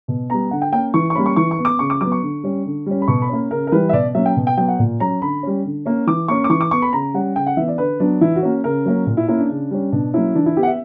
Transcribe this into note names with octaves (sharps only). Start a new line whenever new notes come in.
B2
G3 B3 A#5
D3 F#5
G5
A#3 C#4 G5
E3 C#6
C#6
G3 A#3 C#4 B5
C#6
E3 C#6
C#6
B3
D6
C#3 C#6
D6
F#3 B3 D6
C#6
D3
G3 C#4
D3
G3 C#4
B5
B2 C#6
B5
A#3 C#4
C#3 A#4
A#4
E3 G3 B4
E5
B2 D5
F#3 A#3 C#4 E5
G5
B2
G5
F#3 B3 G5
F#5
A#2
F#3 C#4 A#5
D3 B5
G3 C#4
D3
A#3 C#4
E3 D6
A#3 C#4 C#6
D6
E3 C#6
D6
B3 C#6
B5
C#3 A#5
G3 C#4 F#5
C#3 G5
F#5
E3 B3 E5
D5
D3 B4
F#3 B3 D4
E3 E4
F#4
A#3 C#4
C#3 A#4
F#3 A#3 C#4
A#2
E4
A#3 C#4 E4
D4
C#3
G3 C#4
B2 D4
F#3 A#3 C#4 E4
E3 D4
E4
B3 G4
F#5
E5